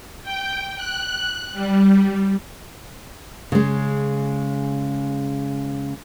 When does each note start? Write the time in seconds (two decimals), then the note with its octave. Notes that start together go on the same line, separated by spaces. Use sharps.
0.23 G5
0.77 F#6
1.53 G3
3.52 C#3 G#3